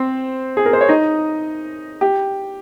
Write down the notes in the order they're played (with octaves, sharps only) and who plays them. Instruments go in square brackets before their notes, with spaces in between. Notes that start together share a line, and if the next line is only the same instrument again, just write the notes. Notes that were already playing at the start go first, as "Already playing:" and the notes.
Already playing: [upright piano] C4 C5
G#4
A#4
C5
C#5
D#4 D#5
G4